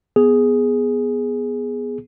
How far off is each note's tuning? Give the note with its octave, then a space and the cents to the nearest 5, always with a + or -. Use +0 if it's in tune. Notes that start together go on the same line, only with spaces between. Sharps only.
B3 +0 G#4 +0